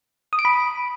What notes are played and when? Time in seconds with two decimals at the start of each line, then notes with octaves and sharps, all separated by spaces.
0.33 D#6
0.39 D7
0.45 B5